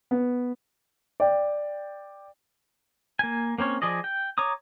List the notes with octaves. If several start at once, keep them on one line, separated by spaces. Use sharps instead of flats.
B3
D5 G5
A#3 G#5
A#3 C4 C#4 C#5
F3 G#4 D5 D#5
G5
C#5 A#5 D6 D#6